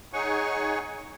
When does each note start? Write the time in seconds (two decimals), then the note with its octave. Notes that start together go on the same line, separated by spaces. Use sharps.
0.13 D#4 G#4 C#5 F#5 G#5 C#6